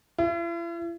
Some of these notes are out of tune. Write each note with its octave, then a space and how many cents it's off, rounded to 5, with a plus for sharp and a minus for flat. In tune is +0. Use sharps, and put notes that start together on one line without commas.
E4 +45